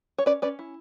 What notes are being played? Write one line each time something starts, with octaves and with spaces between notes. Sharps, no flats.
C#5
C#4 B4 D5
C#4 B4 D5
E4